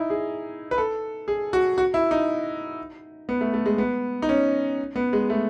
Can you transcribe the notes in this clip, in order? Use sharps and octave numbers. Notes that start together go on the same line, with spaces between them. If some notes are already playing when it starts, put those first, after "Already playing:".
Already playing: D#4 E4
G#4
B4
A4
G#4
F#4
F#4
E4
D#4
B3
A3
A3
G#3
B3
D#4
C#4
B3
G#3
A3